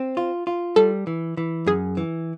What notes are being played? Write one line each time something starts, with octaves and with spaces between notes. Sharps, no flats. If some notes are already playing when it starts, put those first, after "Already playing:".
Already playing: C4
F4
F4
G3 A4
E3
E3
F#2 G#4
E3